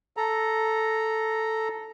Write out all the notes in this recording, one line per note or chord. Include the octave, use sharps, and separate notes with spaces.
A4 A#5